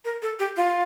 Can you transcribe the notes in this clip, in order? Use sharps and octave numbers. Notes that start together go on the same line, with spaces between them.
A#4
A4
G4
F4